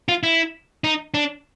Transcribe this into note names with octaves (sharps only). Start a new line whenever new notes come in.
F4
E4
D#4
D4